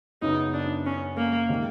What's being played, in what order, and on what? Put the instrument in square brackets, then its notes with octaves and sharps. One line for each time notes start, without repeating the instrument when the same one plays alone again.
[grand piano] F#2 C#3 F#3 B3 [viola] D#4
[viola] D4
C#4
A#3
[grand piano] C3 D#3 G#3